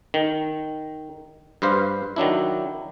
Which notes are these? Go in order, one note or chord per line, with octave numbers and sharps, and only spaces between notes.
D#3
G2 B4 C5 F5
D#3 F#3 D4 E4